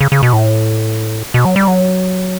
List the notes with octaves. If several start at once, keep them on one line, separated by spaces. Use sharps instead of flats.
C#3
C#3
B2
A2
B2
F#3
G3
F#3